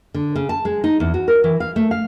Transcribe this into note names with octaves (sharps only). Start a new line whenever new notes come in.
D3
C#3
A5
G#3
D#4
E2
F#4
A#4
E3
F5
A3
F5